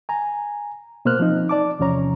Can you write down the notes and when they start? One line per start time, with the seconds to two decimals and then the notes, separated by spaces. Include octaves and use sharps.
0.09 G#5 A#5
1.05 B2 A#3 C5 F6 F#6
1.19 F3 C4 D#4
1.49 D5 A5 D6
1.79 E2 C3 F3 C#4 C#5 A#5